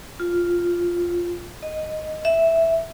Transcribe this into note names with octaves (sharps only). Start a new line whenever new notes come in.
F4
D#5
E5